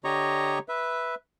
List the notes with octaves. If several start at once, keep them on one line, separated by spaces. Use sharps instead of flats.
D3 G4 C#5 D#5 A#5 C#6
B4 E5